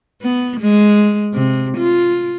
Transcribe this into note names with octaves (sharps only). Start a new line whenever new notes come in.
B3
G#3
C3
F4